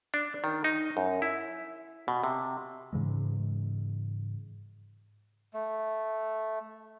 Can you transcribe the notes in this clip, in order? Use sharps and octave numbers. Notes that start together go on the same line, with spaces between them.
D4
D#3
D#4
F#2
E4
B2
C3
G#2 C#3 E3 G#3
A3